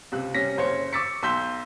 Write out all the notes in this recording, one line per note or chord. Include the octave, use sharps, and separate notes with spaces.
C#2 C3 F#6
C3 G3 C#4 A#6 B6
F#1 C5 C#5 C#7
C#6 D6 E6 A6 B6 C#7
B1 C6 E6 G6 B6 G7